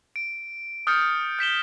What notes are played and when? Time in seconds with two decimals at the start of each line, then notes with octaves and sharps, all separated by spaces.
0.16 D7
0.87 D#6 F6 G6 A6 C#7
1.39 G6 B6 E7 G7